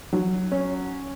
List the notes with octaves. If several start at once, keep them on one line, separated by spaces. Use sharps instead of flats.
F#3
C#4